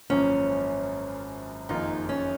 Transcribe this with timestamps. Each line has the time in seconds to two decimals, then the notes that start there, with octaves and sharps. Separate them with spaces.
0.10 G#1 F#2 F3 A#3 C#4
1.69 F#1 F2 D#3 A#3 D#4 F4
2.09 C#4